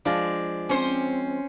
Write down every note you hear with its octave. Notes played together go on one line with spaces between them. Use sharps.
F3 G#3 D4
C4 C#4 C5